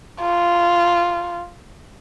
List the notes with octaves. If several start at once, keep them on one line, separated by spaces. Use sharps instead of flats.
F4